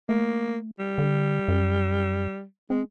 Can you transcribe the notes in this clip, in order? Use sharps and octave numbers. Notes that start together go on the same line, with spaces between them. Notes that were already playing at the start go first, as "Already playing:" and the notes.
A3 A#3
G3
D3
F#2
G#3 C4